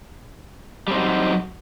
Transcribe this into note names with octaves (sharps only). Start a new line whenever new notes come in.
F#3 G3 C4 D#4